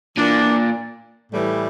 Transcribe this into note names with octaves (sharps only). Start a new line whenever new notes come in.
A#2 E3 A#3 D4
A2 E3 G3